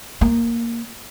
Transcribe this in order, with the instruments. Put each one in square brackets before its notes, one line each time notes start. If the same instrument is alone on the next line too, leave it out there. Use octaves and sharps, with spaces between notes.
[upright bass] A#3